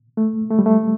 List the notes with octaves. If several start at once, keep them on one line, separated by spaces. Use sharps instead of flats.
A3
A3
G3
A3